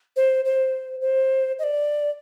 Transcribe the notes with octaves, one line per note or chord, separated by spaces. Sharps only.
C5
C5
C5
D#5
D5